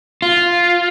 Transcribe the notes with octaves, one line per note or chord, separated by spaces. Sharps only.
F4